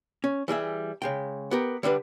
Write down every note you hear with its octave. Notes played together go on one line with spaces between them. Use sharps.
C#4
E3 G3 G#4 E5
C#3 G#3 G5
B3 G4 A#4
D3 G3 D4 B4